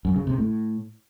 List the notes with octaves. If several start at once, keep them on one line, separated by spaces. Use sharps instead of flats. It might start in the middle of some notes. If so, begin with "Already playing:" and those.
F#2
C#3
C3
A2